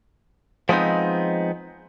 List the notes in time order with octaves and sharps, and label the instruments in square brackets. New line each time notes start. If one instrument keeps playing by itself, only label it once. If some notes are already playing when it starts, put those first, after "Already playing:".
[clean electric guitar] F3 G#3 B3 C4 D#4